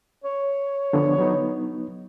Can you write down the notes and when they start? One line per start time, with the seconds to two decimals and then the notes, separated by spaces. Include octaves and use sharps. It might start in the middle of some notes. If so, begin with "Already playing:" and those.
0.24 C#5
0.93 D3 F3 B3
1.18 F#3 B3 D#4